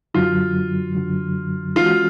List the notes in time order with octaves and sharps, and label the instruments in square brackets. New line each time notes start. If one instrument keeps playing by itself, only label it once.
[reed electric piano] F#2 D3 F#3 [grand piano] F4
[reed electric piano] F#2 D3 F#3
[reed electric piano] E3 G#3 C#4 F#4 [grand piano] F4